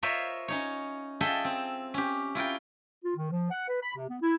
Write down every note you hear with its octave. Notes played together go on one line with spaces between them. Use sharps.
F4 A#4 C5 C#5 D#5 E5
C#4 D#4 C#5
F4 G#4 A4 D#5 E5 G5
C4
C#4 G4
E4 F4 A#4 G5
F4
D#3
F3
F#5
B4
B5
C3
B3
E4